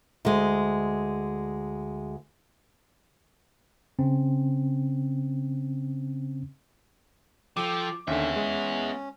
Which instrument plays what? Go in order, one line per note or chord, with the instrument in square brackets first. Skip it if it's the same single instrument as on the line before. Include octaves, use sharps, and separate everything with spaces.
[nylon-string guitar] D2 G#3
[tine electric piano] C#3 C4 C#4
[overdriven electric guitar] F3 [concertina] A4 G5 [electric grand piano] D6
[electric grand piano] D#2 D3 [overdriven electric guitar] B3 E5 [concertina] C#4
[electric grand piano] G#3